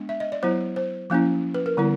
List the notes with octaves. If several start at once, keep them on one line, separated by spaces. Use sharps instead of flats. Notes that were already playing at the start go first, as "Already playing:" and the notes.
Already playing: G#3 B3 D4
E5
D#5
D5
F#3 B3 E4 C5
C5
F3 A#3 C#4 E4
B4
A#4
D3 G3 B3 E4